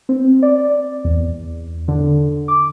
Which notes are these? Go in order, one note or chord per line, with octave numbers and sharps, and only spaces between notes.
C4
D5
E2
D3
D6